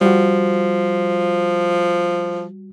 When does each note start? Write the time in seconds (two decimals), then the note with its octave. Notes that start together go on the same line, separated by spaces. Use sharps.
0.01 F3 G3 F#4